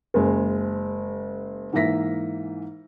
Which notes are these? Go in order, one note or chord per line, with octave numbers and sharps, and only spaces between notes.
F#1 G#3 C5
G#2 E3 A#3 E5 A#6 B6